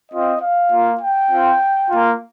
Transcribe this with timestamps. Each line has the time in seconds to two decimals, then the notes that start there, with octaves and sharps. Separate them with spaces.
0.11 C4 F4 D#5
0.41 F5
0.71 A#3 F4
1.01 G5
1.30 C4 F4
1.89 A#3 F4